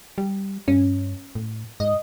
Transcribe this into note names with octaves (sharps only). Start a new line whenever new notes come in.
G3
G2 C#4
A2
G#2 D#5